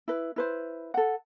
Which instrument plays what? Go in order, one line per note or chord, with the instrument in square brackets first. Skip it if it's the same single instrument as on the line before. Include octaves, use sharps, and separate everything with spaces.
[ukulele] E4 B4
E4 B4 C5
A4 F#5